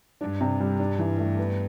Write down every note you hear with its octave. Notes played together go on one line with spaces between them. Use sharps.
G2 D4
C3
G3
D4
E3
A3
B3